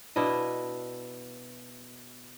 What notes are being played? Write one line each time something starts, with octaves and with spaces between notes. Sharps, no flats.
B2 D4 E4 D#5